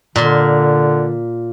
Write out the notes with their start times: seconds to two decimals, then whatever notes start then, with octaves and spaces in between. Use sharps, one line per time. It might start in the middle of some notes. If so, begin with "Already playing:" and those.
0.16 A#2 D3 C6